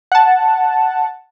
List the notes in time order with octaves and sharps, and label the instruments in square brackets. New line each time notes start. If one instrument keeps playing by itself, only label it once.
[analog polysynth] F#5 A5